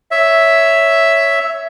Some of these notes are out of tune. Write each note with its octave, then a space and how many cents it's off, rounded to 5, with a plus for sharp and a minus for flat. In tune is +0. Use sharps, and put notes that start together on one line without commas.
C#5 +5 E5 +0